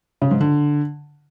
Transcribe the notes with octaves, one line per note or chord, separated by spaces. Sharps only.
C#3
G#2
D3